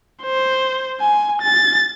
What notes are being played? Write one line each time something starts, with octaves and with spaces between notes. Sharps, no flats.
C5
G#5
A6